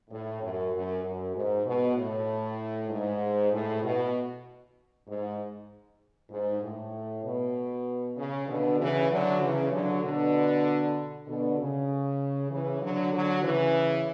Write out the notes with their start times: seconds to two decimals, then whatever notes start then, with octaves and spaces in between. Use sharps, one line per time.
0.10 A2
0.41 F#2
0.73 F#2
1.03 F#2
1.34 G#2
1.65 B2
1.96 A2
2.89 G#2
3.51 A2
3.82 B2
5.07 G#2
6.30 G#2
6.61 A2
7.24 B2
8.16 C#3
8.47 B2 D3
8.78 C#3 E3
9.09 D3 F#3
9.40 C#3 E3
9.71 D3 F#3
10.01 B2 D3
11.26 B2 D3
11.58 C#3
12.50 C#3 E3
12.81 D3 F#3
13.12 D3 F#3
13.43 C#3 E3